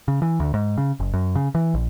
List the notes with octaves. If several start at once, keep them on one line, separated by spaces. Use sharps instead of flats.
C#3
E3
D2
G#2
C#3
F#1
F#2
C#3
E3
A#1